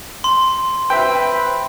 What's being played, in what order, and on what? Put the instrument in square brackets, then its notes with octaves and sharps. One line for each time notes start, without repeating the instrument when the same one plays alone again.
[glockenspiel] C6
[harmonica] C4 B4 [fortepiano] E5 G5